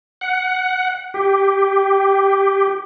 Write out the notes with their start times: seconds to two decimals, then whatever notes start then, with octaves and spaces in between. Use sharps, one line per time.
0.21 F#5
1.14 G4